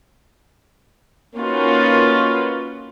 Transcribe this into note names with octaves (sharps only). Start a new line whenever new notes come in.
A#3 C#4 D#4 F4 F#4 B4